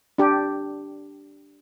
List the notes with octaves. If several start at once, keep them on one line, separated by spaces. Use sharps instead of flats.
D4 G4